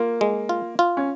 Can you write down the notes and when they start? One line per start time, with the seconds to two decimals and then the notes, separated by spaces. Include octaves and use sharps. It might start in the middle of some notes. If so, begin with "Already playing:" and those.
Already playing: A#3 F4
0.21 G#3
0.49 F4
0.79 F4
0.97 C#4